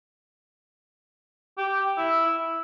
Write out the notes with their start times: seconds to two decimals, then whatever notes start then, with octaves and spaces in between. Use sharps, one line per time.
1.58 G4
1.98 E4
2.26 E4